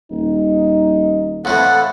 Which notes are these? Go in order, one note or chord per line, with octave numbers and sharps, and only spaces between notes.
D#1 D#4
F2 A2 E3 F#5